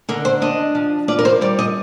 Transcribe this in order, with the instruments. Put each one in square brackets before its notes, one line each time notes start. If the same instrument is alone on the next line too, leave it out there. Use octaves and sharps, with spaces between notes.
[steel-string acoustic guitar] D3 A#4
C5
D4 D#5
F3
F4 D5
A#4
C5
G3 D5
D#5